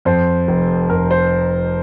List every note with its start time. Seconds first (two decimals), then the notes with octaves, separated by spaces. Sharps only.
0.05 F2 C5
0.48 F1
0.90 F1 A#4
1.11 C5